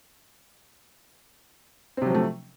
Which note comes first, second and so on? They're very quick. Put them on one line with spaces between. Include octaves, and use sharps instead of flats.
C4 C3 F#3 F3 A3